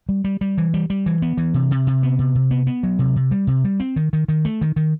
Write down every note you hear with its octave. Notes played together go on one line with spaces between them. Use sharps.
G3
G3
G3
E3
G3
G3
E3
B3
E3
C3
C3
C3
B3
C3
C3
B3
B3
F#3
C3
C3
G3
C3
G3
C4
D#3
D#3
D#3
A3
D#3
D#3